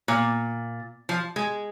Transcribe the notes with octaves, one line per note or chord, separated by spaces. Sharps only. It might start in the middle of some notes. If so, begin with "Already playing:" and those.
A#2
F3
G#3